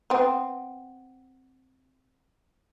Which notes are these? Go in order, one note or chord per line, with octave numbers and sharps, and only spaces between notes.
B3 C4